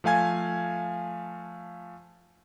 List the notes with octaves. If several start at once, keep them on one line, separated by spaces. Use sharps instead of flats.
F3 A3 F5 G#5 G#6